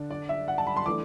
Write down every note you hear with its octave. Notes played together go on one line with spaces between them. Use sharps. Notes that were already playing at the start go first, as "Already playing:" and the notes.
Already playing: D3 D4
D5
E5
F#5
A5
B5
C6
E3 A3 D4 D6